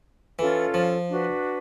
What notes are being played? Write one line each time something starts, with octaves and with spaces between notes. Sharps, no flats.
E3 C#4 F4 A4
F3
D4 F#4 B4